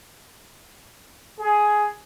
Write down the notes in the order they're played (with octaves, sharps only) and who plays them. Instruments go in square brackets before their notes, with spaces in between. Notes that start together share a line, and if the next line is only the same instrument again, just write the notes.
[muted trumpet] G#4